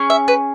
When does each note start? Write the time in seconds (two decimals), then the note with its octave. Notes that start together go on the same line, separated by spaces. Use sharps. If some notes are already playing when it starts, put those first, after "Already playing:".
Already playing: C#4 G#4
0.10 E5
0.28 B4